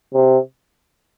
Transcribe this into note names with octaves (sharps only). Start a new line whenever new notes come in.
C3